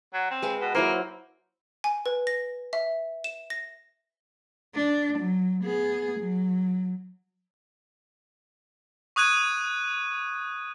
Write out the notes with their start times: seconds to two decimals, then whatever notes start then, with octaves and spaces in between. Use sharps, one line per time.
0.14 F#3
0.30 C4
0.42 G#3 B4 F5
0.60 B2
0.75 F#3 A#3 E4 C5
1.84 G#5
2.06 B4
2.27 A#6
2.73 E5
3.24 E7
3.50 A#6
4.74 D4
5.18 F#3
5.64 B3 G#4
6.19 F#3
9.16 C#6 D#6 F#6 G#6 D#7